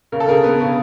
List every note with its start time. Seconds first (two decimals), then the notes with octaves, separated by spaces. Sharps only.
0.12 C#3 A#4
0.20 A4
0.28 C#3 G#4 A#4
0.43 B3
0.60 C#3